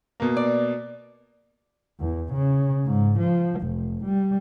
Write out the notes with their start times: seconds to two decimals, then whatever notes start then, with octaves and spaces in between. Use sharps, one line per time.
0.20 B2 A#3
0.37 D5
2.00 E2
2.33 C#3
2.86 G#2
3.19 F3
3.61 F1
4.05 G3